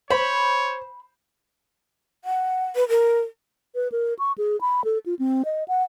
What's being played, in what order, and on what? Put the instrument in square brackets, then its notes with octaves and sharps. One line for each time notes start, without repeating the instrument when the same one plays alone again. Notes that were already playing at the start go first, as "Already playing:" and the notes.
[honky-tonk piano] C5 [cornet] C#5 [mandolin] B5
[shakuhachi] F#5
B4
A#4
[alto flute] B4
A#4
C#6
G#4
B5
A4
F4
C4
D#5
F#5